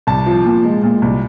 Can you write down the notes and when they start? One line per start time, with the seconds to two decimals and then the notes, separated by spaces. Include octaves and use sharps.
0.07 C2 A5
0.26 F3
0.45 A#2
0.64 G#3
0.83 A#2
1.02 C2